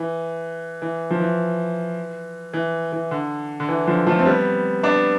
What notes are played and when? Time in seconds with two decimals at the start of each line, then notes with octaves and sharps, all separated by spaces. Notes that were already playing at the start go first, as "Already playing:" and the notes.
Already playing: E3
0.82 E3
1.10 F3
1.20 E3
2.53 E3
2.92 E3
3.11 D3
3.60 D3
3.69 E3
3.87 D3 F3
4.07 F3 A3
4.19 C4
4.25 G3 B3
4.83 B3 D4